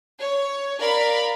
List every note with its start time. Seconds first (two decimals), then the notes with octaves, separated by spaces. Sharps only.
0.21 C#5
0.80 A#4 D5 F5 B5